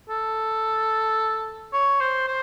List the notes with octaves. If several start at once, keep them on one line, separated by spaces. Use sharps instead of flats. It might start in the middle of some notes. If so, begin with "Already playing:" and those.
A4
C#5
C5
C5